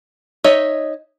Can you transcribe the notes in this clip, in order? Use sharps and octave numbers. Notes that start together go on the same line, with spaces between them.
D#4 C#5 D#5 E5